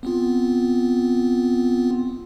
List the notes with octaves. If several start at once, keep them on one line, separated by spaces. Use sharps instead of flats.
B3 C4 F4